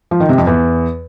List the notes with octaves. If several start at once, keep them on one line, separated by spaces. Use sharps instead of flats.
F3
D#3
C3
F2
E2